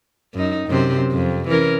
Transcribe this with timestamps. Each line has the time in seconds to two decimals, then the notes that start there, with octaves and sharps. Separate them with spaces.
0.34 F#2 D#4
0.68 F#2 C3 C5
1.11 F2
1.48 E3 C#4 A#4